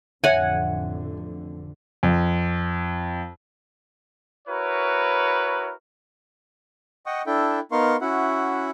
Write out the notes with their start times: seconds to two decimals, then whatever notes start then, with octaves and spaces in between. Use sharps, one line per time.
0.24 A1 F2 D3 C#5 E5 F#5 G#5
2.03 F2
4.48 E4 F#4 A#4 B4 C#5
7.06 D#5 F#5 G5 C#6 D#6
7.27 D4 E4 A4 E5 G5
7.72 B3 D#4 A#4 F5 C6 C#6
8.01 C#4 E4 F#4 E5 F#5